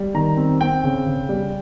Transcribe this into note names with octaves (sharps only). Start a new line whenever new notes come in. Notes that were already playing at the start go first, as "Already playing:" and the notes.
Already playing: G3
D#3 A#5
C4
C4 G5
C#3
C#3
G3